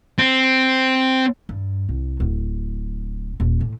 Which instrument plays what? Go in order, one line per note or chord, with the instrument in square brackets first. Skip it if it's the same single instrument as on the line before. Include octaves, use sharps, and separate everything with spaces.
[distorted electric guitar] C4
[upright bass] G2
C2
D1
D#1
A2